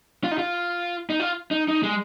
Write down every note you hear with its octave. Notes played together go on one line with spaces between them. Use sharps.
F4
D#4
F4
D#4
F4
D#4
D#4
G#3